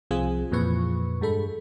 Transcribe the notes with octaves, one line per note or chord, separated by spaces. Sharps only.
C2 F3 C4 F4 G#4 G#5
F2 A#2 E3 F3 B4 C#6
G2 G#3 A4 B5